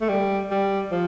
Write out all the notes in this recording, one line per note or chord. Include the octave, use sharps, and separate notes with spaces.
A3
G3
G3
F3